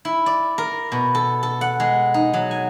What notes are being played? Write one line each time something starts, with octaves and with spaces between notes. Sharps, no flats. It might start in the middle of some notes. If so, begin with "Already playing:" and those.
E4
D5
A#4
B2
A4
A4
F#5
G#3
D#4
F#3
G#5